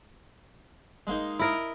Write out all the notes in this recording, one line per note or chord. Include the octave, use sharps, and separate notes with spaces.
G#3 A#3 D#4
E4 A#4 D#5